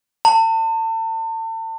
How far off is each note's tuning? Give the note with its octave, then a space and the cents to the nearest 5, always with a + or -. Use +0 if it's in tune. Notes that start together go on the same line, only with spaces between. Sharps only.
A5 +40